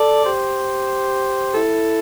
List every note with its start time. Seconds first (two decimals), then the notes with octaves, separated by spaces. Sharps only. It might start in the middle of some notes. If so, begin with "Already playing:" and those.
Already playing: A4 D5
0.25 G4 C5
1.55 E4 A4